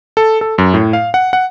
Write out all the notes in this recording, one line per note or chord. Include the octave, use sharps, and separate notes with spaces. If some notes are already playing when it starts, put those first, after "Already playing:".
A4
A4
F#2
A2
F5
F#5
F#5